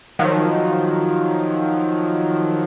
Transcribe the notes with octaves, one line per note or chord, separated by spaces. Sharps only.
D#3 F3 F#3